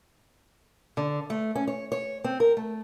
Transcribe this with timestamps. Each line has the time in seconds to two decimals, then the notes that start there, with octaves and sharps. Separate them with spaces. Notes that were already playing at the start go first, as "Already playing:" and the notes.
0.97 D3
1.30 A3
1.55 C#4
1.67 C#5
1.92 C#5
2.24 C4
2.40 A#4
2.57 A3